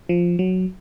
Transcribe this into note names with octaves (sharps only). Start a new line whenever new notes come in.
F3
F#3